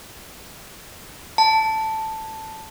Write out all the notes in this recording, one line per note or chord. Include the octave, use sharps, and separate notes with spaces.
A5